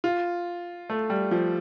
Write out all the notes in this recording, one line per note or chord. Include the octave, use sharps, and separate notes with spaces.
F4
A3
G3
F3